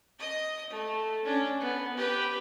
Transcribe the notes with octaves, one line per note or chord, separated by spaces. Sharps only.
D#5 D#6
A3
C#4 D4
B3
G4 B4